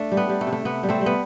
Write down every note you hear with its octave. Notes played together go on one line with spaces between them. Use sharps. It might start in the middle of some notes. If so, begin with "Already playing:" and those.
Already playing: A3 D4
G3
B3
G3
A3
C3
A3
C3 B3
G3
A3 C4
G3
B3